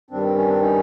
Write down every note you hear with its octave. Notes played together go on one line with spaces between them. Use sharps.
G2 D#3 G3 C4 D4
C4
C#4
C4 D4
C#4 D#4